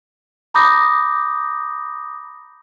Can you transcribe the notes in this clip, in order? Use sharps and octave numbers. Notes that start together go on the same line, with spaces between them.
A#5 B5 D6 D#6 G6 A#6